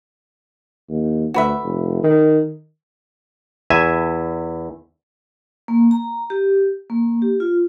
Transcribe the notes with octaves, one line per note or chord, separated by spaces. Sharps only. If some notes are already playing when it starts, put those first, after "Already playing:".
D#2
D2 F#4 B4 E5
F1
D#3
E2 E5 G#5
A#3
A#5
G4
A#3
G4
F4